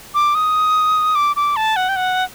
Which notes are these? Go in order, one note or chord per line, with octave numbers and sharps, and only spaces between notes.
D6
D#6
D6
D6
A5
F#5
G5
F#5